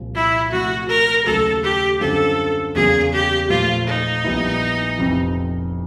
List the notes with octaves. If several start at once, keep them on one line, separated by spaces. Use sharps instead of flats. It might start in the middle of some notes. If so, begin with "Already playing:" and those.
Already playing: C2 A#2 F3
E4
C3 F3 A3 F#4
A#4
D#2 C#3 F#3 A3 A4
G4
F#2 D3 G3 C4 F4 A4
E2 C#3 F#3 A#3 G#4
G4
A#2 F3 A3 F4
D#4
A#1 A#2 G3 B3 E4
F1 F2 C3 E3